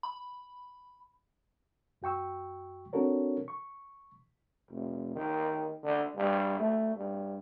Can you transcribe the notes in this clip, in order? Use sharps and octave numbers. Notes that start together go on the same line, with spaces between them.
B5
F#2 F#4 G5 C#6 E6
C4 D4 F#4 A4 A#4 C#5
C#6
F1
D#3
D3
G2
A3
G2